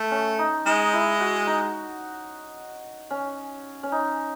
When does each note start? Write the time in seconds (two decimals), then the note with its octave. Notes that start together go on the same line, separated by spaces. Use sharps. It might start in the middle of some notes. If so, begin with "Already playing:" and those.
Already playing: A3
0.11 C#4
0.39 D#4
0.66 G#3 D#4
0.93 E4
1.20 F#4
1.47 D#4
3.10 C#4
3.83 C#4
3.92 D#4